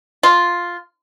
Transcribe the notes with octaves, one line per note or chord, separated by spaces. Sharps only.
F4